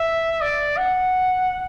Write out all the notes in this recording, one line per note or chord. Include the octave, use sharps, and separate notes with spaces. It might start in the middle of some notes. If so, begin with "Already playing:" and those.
Already playing: E5
D5
F#5